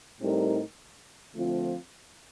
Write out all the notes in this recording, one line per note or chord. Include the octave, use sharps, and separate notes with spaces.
A2 G3 C4 D#4 A#4
D3 F3 A3 C4 F4